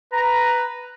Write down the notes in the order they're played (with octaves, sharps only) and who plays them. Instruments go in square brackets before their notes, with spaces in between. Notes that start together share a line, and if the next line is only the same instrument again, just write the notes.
[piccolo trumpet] B4 [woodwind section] A#5